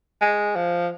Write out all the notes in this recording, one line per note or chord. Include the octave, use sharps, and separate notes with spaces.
G#3
F3